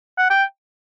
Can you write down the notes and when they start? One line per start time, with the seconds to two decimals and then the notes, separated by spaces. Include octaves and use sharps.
0.18 F#5
0.30 G5